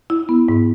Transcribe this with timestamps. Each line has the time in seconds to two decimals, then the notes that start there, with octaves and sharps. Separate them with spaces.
0.10 E4
0.29 B3
0.49 G#2